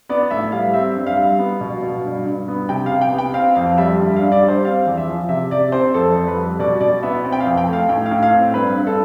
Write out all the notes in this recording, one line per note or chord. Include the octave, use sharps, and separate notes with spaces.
B3 D5
A2 E5
G3 F5
C4 E5
G2
F5
G3
B3
B2
B2
G2
G2
B3
C3 G5
F5
C3
G5
B3
G5
C4 F5
F2 F5
G3 E5
G2
F5
G2
D5
G3
C5
C4 F5
E2
E5
F3
C3 E5
C3 D5
C4 C5
F2 A4
F2
B4
G3
B2 D5
B2 D5
B3 E5
C4
G5
F5
F2
G5
A3 F5
A2 G5
F5
A2
F5
C4
G2 B4
G2
A4